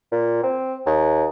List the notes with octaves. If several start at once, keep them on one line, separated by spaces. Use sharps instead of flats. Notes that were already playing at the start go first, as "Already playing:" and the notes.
A#2
C4
D#2